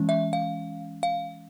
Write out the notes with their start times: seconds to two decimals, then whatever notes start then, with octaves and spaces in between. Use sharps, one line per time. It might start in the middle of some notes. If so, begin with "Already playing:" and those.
Already playing: E3 G#3 C#4
0.09 E5
0.33 F5
1.03 F5